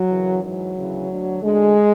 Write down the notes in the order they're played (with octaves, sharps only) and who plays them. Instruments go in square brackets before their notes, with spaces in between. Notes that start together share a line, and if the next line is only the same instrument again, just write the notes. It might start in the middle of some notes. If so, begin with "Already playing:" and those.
Already playing: [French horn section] F#3
F#2 C#3 E3
G#2 E3 F#3
D2 C#3 E3
D2 D3
D2 D3 G#3